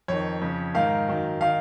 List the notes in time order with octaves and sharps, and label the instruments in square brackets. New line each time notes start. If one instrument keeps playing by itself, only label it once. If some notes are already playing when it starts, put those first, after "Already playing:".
[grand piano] F2 D#3 C#5
F2 C#3
G#2 D#3 F5
F#2 D#3
D#3 F5